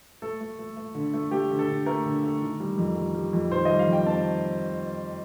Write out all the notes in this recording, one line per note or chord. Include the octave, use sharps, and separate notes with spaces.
A3 A4
A3
A3
A3
D3
A3
A3 G4
D3
A4
D3
A3 A#4
D3
A3
D#3
G3
F2
G3
G3
F2
D#3 C5
G3 D#5
F5
F2
G5
C4 A5